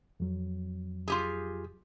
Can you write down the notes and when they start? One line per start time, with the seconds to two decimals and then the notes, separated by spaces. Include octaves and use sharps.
0.20 F2 F#3
1.08 F4 G4 G#4